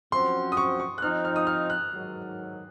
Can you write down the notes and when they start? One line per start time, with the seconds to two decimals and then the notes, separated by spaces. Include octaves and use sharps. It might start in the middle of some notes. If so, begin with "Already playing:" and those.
0.12 F#2 F3 C4 F#4 C6
0.52 D#6
0.57 C#6
0.80 C#6
0.98 F#6
1.02 F3 C4 D#4 F6
1.25 F6
1.36 D#6
1.47 F6
1.70 F#6
1.92 G#2 D#3 F#3